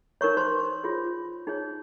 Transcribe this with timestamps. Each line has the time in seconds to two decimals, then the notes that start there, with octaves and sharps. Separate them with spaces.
0.21 D#4 A#4 C#5 C#6
0.37 C5 C6
0.84 F4 G#4 C#5
1.47 D#4 G#4 C#5